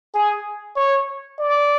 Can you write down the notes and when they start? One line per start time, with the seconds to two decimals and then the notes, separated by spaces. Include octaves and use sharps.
0.15 G#4
0.77 C#5
1.39 D5